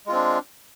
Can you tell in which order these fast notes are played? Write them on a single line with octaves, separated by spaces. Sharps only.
G#3 F4 C4 D4